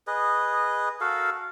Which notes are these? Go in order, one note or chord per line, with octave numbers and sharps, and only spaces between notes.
G#4 B4 D#5
F#4 A4 A#4 F5